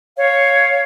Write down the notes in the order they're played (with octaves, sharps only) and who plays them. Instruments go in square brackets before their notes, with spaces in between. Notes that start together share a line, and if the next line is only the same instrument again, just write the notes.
[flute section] C#5 F5